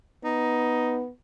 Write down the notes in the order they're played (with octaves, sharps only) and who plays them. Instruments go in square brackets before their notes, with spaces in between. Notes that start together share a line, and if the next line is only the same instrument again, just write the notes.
[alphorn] B3 [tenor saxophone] D#4